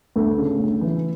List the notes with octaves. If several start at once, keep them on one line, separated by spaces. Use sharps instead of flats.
D2 A3
C#3
D2
E3